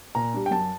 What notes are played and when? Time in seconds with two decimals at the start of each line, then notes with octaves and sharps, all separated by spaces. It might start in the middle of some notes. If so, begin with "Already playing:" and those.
0.15 A#2 A#5
0.34 G3 D4
0.46 G5
0.51 F#2 A5